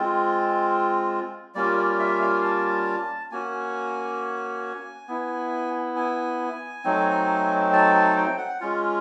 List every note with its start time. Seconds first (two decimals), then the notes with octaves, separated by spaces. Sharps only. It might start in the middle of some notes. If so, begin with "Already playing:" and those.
Already playing: G#3 C4 F4
1.55 G3 A#3 C#4 F4 D5
1.78 D5
1.99 E5
2.22 F5
2.43 A5
3.31 A#3 C#4 F#4 G#5
5.08 B3 E4
5.96 G#5
6.84 F#3 A3 C4 D#4
7.73 A5
7.95 A5
8.16 G5
8.38 F#5
8.61 G#3 C#4 F4